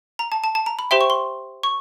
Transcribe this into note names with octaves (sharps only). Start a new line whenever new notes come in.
A#5
A5
A5
A5
A#5
B5
G4 C5 E5 G5 C6
C#6
C6
C#6